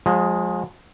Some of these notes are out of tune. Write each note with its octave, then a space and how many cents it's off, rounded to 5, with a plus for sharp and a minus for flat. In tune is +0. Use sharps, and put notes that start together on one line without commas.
F3 +35 G#3 -5